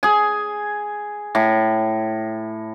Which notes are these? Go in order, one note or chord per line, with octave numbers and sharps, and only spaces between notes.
G#4 G#5
A2